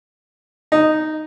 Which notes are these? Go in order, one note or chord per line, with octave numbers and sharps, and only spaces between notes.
D#4